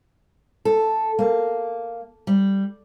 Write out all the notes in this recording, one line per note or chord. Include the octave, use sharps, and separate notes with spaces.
A4
A#3
G3